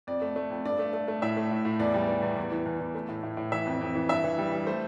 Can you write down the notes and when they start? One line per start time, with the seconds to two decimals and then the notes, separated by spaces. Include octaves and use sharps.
0.07 F2 D5
0.22 A3
0.36 A3
0.50 F2
0.65 G2 D5
0.79 A3
0.93 A3
1.08 A3
1.22 A2 E5
1.37 A3
1.51 A2
1.65 A2
1.79 E2 D5
1.94 G3
2.09 E3
2.22 E2
2.37 E2
2.52 E3
2.66 E2
2.80 E3
2.95 A3
3.09 A2
3.23 A2
3.37 A2
3.52 E3 E5
3.66 F2
3.81 F2
3.95 E3
4.09 G2 E5
4.24 E3
4.38 G3
4.52 G3
4.67 A3 C5